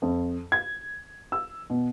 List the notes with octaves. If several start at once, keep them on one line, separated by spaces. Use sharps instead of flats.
F2
G#6
E6
B2